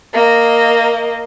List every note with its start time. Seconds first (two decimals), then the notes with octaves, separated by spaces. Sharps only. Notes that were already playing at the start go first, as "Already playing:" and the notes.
0.13 A#3 D#5